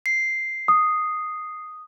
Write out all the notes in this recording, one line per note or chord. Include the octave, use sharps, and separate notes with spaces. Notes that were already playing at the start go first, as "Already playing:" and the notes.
C7
D#6